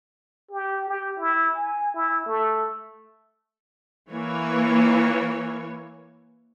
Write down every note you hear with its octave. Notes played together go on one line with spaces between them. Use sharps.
G4
G4
E4
G#5
E4
A3
E3 A#3 C#5